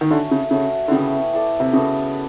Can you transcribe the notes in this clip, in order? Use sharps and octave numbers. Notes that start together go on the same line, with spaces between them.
D#3
D3 F#3 A3 C#4
C#3
C#3 A3 C#4 F#4
D3
C#3 B3 E4 G4
E4 A4 D5
C3
C#3 B3 D4 F#4 A4